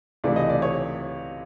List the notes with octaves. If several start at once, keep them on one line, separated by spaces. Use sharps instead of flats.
C#2 C3 E3 A3 D5
D#5
D5
C#5